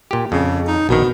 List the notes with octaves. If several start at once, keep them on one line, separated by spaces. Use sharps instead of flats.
A#2 G4
F2 C#3
D#4
A#1 B2 D#3